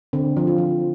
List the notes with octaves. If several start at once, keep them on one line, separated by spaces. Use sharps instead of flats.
D3 C4
F3
F4
F3